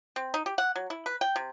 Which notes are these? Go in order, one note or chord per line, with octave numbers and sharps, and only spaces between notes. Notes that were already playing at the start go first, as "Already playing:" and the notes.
C4
D#4
G4
F#5
F#3
E4
B4
G5
C3